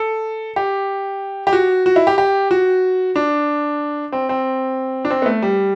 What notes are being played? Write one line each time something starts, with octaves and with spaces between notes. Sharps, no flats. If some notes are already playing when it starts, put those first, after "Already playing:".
Already playing: A4
G4
G4
F#4
F#4
E4
G4
G4
F#4
D4
C4
C4
D4
C4
B3
A3
G3